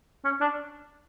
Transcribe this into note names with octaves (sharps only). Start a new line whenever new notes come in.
C#4
D4